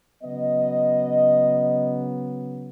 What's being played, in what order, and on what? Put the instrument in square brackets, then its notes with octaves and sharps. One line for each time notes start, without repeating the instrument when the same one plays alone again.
[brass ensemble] C#3 F#3 B3 D#5